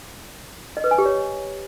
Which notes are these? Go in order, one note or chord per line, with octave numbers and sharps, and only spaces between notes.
D#5
B4
G#5
G4
C#5